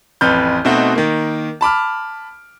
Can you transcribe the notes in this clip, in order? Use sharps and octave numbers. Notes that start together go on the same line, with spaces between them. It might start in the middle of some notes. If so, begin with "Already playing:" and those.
A1 F2 B4 F6 G6
B2 A3 C4 D#4 F#4
D#3 A#3
A5 B5 D6 F6